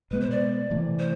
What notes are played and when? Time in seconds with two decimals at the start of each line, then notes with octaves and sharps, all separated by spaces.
0.11 B2 G#3 B3 B4
0.21 C5
0.31 D5
0.70 C3 E3 A3
0.99 C5